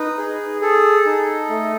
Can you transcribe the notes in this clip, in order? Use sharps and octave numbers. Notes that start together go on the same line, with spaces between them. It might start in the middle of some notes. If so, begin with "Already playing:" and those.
Already playing: D#4 B4
G#4
G#4 A4
D#4
A3